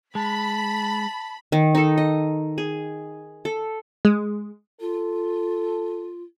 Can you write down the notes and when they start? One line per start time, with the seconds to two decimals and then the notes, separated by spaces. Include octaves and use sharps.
0.15 G#3 A5 B5
1.52 D#3
1.75 D#4 A4
1.97 D#5
2.58 G#4
3.45 A4
4.05 G#3
4.81 F4 A4